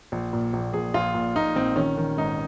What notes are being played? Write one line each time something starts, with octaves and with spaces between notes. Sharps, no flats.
A#1
A#2
A#1
A#1 G#4
A#1 F4
A#2
A#2 D#4
A#1 C4
D#3 C#4
D#3
G#1 D#4